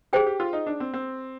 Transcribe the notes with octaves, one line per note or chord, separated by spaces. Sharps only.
G4 G#4 C5 G5
G4
F4
D#4
D4
C4
C4